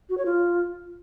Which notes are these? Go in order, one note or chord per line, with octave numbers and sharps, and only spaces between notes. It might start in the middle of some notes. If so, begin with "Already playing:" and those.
F#4
C#5
F4